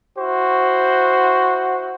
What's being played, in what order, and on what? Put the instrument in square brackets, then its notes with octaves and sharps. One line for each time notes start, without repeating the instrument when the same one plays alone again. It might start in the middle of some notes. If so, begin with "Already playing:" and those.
[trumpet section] E4 F#4 C5